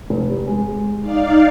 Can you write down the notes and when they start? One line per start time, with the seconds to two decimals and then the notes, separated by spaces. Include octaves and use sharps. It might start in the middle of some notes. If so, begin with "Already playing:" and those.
0.10 F1 G4
0.47 G#3
1.01 D#4 D5 F5